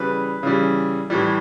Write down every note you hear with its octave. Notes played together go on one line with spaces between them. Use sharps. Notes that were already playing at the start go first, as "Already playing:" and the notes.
Already playing: C#3 E3 G3 B4
C#3 E3 G3
A2 E3 G3